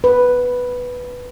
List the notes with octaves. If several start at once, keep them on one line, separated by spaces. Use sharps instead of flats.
B4